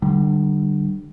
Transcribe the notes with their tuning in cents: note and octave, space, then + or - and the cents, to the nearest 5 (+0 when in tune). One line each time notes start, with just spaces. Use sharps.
D3 +30 G3 -15